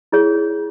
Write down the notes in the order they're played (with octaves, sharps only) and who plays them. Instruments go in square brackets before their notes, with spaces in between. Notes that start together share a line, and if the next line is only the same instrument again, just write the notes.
[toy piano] E4 G#4 C#5